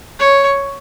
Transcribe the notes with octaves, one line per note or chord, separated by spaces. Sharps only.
C#5